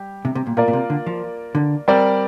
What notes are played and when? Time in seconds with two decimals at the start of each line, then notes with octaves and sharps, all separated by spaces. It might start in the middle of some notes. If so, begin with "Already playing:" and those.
Already playing: G3 G4
0.25 C3
0.35 C3
0.47 A#2
0.57 A#2 A#3 F4 A#4 D5
0.68 A#2
0.73 C3
0.90 D3
1.07 F3
1.55 D3
1.88 G3 C4 A#4 D5